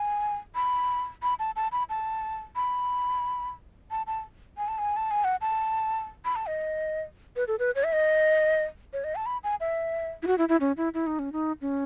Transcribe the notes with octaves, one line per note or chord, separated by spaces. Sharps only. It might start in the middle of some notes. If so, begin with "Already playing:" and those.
Already playing: G#5
B5
B5
A5
A5
B5
A5
B5
A5
A5
G#5
A5
G#5
A5
G#5
F#5
A5
B5
A5
D#5
B4
A4
B4
C#5
E5
D#5
C#5
D#5
A5
B5
G#5
E5
E4
F#4
E4
E4
C#4
E4
E4
D#4
C#4
D#4
C#4